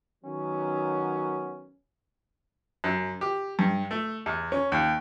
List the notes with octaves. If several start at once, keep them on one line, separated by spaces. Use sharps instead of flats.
D#3 F#3 B3 C#4
F#2
G4
G2
A3
E2
C#4
D#2